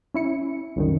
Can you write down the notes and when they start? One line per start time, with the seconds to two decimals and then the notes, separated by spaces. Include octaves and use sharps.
0.14 C#4 E4 C#7
0.76 C2 F#2 D#3